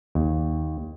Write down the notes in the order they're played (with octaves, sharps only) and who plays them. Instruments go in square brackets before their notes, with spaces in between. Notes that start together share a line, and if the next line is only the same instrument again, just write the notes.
[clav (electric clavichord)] D#2